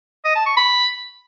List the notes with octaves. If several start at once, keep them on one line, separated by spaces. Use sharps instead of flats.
D#5
A5
C#6
B5